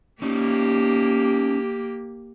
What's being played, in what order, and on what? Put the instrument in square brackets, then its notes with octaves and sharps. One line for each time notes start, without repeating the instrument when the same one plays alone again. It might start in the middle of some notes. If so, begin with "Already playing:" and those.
[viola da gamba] A#3 G4 [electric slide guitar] C#4 D#4